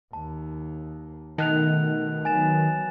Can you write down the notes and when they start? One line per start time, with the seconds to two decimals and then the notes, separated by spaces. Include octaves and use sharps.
0.13 D#2 A5
1.38 B2 D#3 A3 A5 F#6 F7
2.25 F#3 B3 G#5 A6 E7